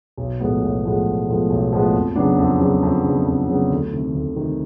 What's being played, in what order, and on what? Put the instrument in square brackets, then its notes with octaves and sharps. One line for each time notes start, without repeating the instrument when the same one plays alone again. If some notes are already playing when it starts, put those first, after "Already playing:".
[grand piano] B1
A2 F3 G#3 B3
B1
A2 F3 G#3 B3
B1
A2 F3 G#3 B3
B1
A2 F3 G#3 B3
F2
C#3 F#3 B3 D4
F2
C#3 F#3 B3 D4
F2
C#3 F#3 B3 D4
F2
C#3 F#3 B3 D4
D2
C3 D#3
D2
C3 D#3